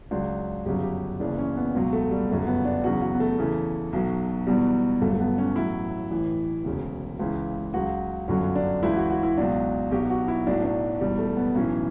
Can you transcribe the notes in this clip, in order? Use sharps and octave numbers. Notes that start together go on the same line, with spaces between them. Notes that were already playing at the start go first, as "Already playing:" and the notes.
C#2 C#3 F#3 D4
G1 F#2 C#3 F#3 G4
G4
F#1 F#2 C#3 E3 D4
C#4
B3
C#2 B2 F#3
A3
G3
G1 F#2 C#3 F#3 A3
B3
D4
E2 C#3 F#3 F#4
F#4
B3
A3
E2 C#3 E3
B1 B2 F#3
E2 B2 F#3 G3
G1 G2 F#3 A3
A3
B3
C#4
A1 A2 F#3 E4
A1 A2 E3
E1 D2 C#3
C#2 C#3 E3
C#2 C#3 F#3 F#4
G1 F#2 D3 F#3 C#4
D4
C#2 C#3 E3 E4
F#4
F#4
E4
C#2 B2 F#3 D4
B1 B2 F#3 G4
F#4
E4
B1 A2 F#3 D4
D4
E1 E2 B2 G3
A3
B3
B1 A2 E3 C#4